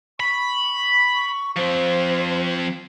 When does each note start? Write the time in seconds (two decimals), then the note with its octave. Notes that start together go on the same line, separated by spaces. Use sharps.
0.20 B5 C#6
1.14 C#6
1.57 F3 C4 C5